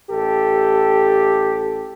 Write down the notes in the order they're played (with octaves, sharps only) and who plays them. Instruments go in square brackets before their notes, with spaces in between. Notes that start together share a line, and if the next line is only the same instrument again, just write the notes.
[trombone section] A1 G4 A4